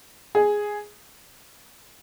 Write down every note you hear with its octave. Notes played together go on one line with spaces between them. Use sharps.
G#4